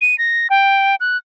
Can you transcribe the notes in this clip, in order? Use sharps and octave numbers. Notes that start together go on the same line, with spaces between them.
D#7
A#6
G5
F#6